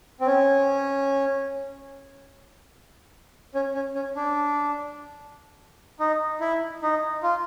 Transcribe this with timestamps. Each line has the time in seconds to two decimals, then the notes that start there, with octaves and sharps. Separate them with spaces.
0.20 C4
0.27 C#4
3.55 C#4
3.74 C#4
3.95 C#4
4.16 D4
6.00 D#4
6.40 E4
6.82 D#4
7.23 F4